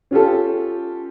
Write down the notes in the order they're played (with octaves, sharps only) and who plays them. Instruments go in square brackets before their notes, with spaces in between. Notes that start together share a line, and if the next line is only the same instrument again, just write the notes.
[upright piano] C#4 F4 G4 A4